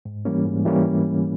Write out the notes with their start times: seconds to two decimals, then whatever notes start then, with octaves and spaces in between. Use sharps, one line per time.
0.05 G#2
0.25 E3 G3 A#3 C#4
0.45 G#2
0.65 E3 G3 A#3 C#4